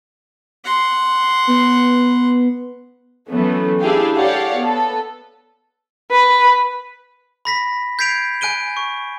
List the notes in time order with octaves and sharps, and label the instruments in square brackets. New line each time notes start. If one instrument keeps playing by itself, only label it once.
[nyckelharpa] F#5 C6
[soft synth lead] B3
[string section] E3 F#3 A3 B3 C#4
D4 E4 G4 G#4 F5 G5
G4 A4 C#5 D5 F5 F#5
B3 A4
[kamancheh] B4
[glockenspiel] B5 A#6 B6
G6 G#6 B6 C7 D7 F7
G#5 F#6 D7 D#7 G7
C#6